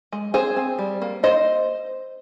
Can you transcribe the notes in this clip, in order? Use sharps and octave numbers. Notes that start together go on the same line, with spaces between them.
G#3
C4 G#4 C5
C4
G3
A#3
A#3 C5 D#5